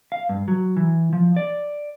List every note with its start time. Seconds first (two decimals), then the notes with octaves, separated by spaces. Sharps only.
0.12 F5
0.29 G2
0.48 F#3
0.77 E3
1.13 F3
1.36 D5